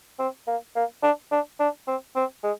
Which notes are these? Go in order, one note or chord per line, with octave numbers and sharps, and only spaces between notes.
C4
A#3
A#3
D4
D4
D4
C4
C4
G#3